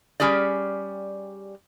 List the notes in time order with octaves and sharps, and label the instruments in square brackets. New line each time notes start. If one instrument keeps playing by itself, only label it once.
[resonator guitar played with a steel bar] G3 C#4 G4 G#4 D5